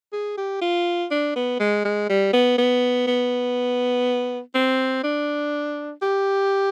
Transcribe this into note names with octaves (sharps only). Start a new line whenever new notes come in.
G#4
G4
F4
D4
B3
G#3
G#3
G3
B3
B3
B3
C4
D4
G4